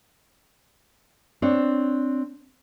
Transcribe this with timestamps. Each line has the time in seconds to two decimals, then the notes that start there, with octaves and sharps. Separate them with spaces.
1.42 C4 D4 C#5